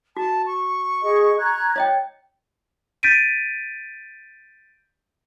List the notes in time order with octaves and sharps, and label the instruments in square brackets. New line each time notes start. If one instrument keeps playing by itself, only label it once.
[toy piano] F#4 [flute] A5
[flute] C#6
[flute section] G#4 D#5
A#5 F#6 G#6
[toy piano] C#5 D#5 G5
[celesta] G6 A6 B6 D7 D#7